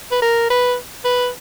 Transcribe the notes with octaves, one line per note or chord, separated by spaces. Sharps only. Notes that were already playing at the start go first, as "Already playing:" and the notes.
B4
A#4
B4
B4